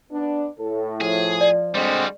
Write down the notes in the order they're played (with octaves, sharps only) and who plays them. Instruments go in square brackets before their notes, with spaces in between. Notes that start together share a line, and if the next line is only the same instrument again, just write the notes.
[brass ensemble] B3 D4
[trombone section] A2 [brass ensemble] A4
[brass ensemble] F3 [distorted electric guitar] G#4
[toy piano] D5
[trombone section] D3 G#3 C4 [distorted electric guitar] G3 F#4